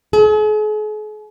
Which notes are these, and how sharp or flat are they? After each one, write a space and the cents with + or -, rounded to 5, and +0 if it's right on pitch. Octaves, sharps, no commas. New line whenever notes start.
G#4 +45